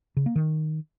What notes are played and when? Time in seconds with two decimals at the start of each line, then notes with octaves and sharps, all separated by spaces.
0.17 C#3
0.26 A#3
0.36 D#3